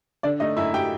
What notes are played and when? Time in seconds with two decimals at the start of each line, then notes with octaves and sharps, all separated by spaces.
0.23 D3 D4 D5
0.40 A3 D#4 D#5
0.57 F#2 E4 E5
0.74 F#3 G4 G5